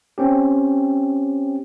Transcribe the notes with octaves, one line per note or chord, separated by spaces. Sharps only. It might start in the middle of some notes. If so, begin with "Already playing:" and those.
C4 C#4 G4